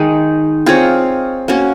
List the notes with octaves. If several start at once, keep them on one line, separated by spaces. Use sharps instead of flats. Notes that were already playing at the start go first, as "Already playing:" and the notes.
Already playing: D#3 G#3 D#4
C4 F4 G#4 C#5
A#3 C#4 F#4